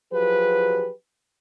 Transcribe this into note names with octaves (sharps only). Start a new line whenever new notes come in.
F3 F#3 G4 G#4 B4